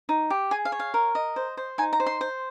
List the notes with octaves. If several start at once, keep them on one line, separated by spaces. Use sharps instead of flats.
D#4
G4
G#4 G#5
F5
C#5
F5
A#4
D#5
C5
C5
D#4 G#5
A#5
C5
C6
C5